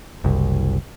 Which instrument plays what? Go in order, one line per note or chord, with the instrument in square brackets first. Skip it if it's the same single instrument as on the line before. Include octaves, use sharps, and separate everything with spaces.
[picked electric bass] F#1 C2